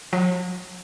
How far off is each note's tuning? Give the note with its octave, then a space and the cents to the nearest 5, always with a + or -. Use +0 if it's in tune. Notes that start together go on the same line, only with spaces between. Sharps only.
F#3 -40